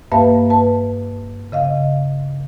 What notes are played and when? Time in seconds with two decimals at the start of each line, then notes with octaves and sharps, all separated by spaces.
0.12 G2 A#3 B4 E5 F5 A5
0.50 B4 A5
1.52 C#3 D#5 F5